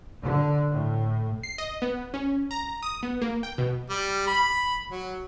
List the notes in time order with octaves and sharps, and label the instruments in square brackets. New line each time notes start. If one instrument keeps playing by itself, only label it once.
[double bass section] D3
A2
[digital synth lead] C7
D#5
B3
C#4
A#5
D#6
B3
A#3
G5
B2
[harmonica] G3
B5
F#3